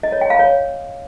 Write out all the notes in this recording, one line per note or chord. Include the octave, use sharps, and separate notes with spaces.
D#5
C#5
G5
F5
C#5